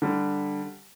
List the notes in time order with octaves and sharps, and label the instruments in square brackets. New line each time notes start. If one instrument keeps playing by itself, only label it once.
[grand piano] D3 G3